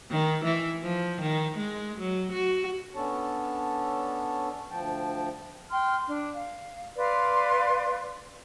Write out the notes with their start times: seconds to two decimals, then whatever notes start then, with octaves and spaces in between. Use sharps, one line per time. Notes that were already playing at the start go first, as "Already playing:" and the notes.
0.11 D#3
0.44 E3
0.82 F3
1.21 D#3
1.57 G#3
1.99 F#3
2.32 F#4
2.95 B3 C#4 D4 A4 C#5 A5
4.71 D2 F3 G5 A5
5.71 G5 C6 F6
6.08 D4
6.35 F5
6.96 B4 D5 F5 C6